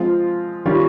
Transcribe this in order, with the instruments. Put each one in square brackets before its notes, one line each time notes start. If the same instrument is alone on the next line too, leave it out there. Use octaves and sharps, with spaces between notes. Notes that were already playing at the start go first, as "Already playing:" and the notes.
Already playing: [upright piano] F3 G#3 C4 F4
D#3 G3 C#4 F4